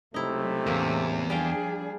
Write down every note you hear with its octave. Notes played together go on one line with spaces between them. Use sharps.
C#2 C3 F#3 A3 D#4 E4
E2 A2 C#3 A#3
F3 G3 D4 G#4 F5 G5